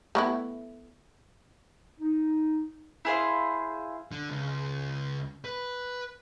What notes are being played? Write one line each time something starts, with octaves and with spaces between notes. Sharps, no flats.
A3 B3 E4
D#4
E4 G#4 C5 F5
D3
C#2
B4